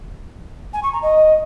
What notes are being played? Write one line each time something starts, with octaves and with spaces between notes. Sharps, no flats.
G#5
C#6
A#5
D#5